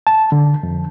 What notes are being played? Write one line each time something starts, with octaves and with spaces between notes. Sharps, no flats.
A5
D3
F2